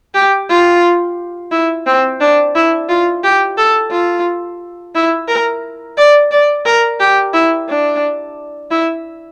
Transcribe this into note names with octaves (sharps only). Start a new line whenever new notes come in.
G4
F4
E4
C4
D4
E4
F4
G4
A4
F4
E4
A#4
D5
D5
A#4
G4
E4
D4
E4